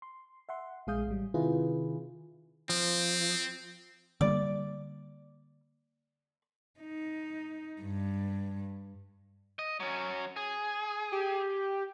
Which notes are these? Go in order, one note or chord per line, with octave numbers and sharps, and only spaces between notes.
C6
E5 F#5 C6
A#1 G#3 G#4 F5 D#6 G6
A1 G3
C3 D#3 E4 F4 G#4 B4
F3 C4
D3 G3 A#3 D5
D#4
G2
D#5
F#3 C#4
G#4
G4